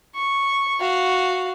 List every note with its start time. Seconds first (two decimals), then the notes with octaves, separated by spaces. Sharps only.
0.15 C#6
0.80 F#4 F5